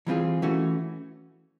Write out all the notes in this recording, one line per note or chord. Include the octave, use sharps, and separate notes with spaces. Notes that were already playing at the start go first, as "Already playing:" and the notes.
E3 G3 C4 F4 G#4
E3 A3 C#4 F#4